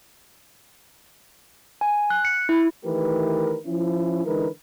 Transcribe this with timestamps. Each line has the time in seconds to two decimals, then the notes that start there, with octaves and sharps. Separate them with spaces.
1.81 G#5
2.10 F#6
2.25 C#7
2.49 E4
2.84 D#3 E3 A3 G4 A#4 B4
3.66 F3 C#4 E4
4.26 D3 E3 G#3 D#4 A#4 B4